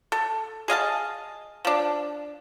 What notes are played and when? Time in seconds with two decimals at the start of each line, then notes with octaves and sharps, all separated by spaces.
0.12 A4
0.68 G#4 D#5 F5 A5
1.65 F3 D4